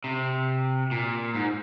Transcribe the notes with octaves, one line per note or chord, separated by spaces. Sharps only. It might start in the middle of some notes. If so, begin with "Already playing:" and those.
C3
A#2
G#2